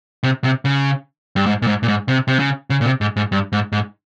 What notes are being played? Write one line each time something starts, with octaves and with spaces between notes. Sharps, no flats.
C3
C3
C#3
G2
G#2
A#2
G#2
A#2
G#2
C3
C3
C#3
C#3
A#2
C3
G#2
G#2
G2
G#2
G#2